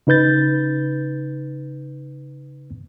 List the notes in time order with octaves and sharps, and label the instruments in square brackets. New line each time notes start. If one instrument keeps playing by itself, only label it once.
[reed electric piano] C#3 D#4 B4 G6 A6